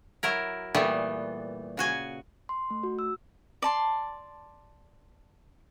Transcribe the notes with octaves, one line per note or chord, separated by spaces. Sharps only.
F#3 E4 A#4
A#2 E3 G3 A3 B3
C#3 F#4 G#5
C6
A3
F#4
E6
D5 A5 C6